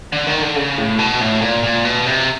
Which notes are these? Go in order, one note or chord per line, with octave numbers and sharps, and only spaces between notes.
D3
D#3
D3
C#3
A2
B2
A2
A#2
A#2
B2
C3